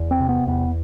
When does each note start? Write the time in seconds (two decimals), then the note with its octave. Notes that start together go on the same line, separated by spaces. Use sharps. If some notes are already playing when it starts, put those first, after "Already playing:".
Already playing: E2
0.11 C4
0.20 C3
0.29 B3
0.47 E2 B3